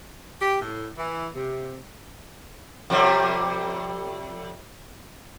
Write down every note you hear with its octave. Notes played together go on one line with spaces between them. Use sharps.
G4
A2
E3
C3
F2 C3 G3